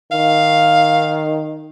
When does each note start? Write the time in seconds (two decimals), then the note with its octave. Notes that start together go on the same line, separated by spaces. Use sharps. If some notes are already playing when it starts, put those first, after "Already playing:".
0.12 D#3 F5